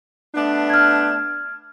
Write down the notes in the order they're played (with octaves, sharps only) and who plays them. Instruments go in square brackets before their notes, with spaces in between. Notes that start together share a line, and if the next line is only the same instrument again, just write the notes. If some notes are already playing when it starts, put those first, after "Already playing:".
[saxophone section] A3 B3 D4
[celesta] F6 G#6